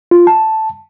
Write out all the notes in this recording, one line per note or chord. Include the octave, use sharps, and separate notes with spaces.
F4
A5